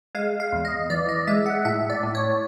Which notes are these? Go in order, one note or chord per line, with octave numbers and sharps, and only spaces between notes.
G#3 F5
F5
E2
D#5
E3 D5
D#5
G#3 E5
F#5
A2 E5
D5
A2
C#5